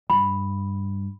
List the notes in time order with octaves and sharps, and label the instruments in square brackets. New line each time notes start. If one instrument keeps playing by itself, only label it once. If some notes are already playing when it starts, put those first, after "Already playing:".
[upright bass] G2 [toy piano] B5